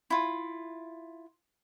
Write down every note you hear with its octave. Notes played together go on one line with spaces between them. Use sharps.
E4 F4